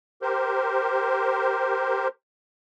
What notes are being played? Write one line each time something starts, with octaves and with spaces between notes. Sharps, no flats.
G4 A#4 C5